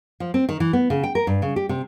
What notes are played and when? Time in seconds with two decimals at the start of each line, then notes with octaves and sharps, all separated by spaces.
0.20 F3
0.34 C4
0.49 D#3
0.60 E3
0.73 B3
0.90 C#3
1.03 G5
1.15 A#4
1.27 G2
1.42 C#3
1.56 G4
1.69 C3